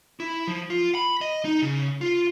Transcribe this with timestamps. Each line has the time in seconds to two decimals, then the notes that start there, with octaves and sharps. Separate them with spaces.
0.20 E4
0.48 F3
0.70 F4
0.95 B5
1.21 D#5
1.45 D#4
1.62 C#3
2.01 F4